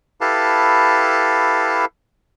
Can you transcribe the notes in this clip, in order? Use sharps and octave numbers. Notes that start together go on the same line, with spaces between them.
E4 G4 A4 B4 F5 A5